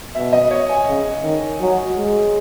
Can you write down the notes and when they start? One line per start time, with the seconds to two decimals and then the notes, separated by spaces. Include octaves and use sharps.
0.15 B2 E5
0.33 D#5
0.51 C#5
0.69 G#5
0.88 C#3
1.23 D#3
1.61 F#3
1.97 G#3